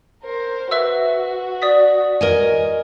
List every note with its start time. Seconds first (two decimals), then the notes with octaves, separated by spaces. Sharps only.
0.23 A#4 C5
0.71 F#4 B4 E5 E6
1.62 D5 D#6 B6
2.21 A#4 D#5 G#5